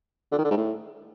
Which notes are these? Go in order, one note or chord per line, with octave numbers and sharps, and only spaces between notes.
D3
D#3
D3
G#2
A2